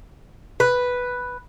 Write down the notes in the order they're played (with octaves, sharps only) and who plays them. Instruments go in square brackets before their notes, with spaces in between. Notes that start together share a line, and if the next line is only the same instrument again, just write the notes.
[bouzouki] B4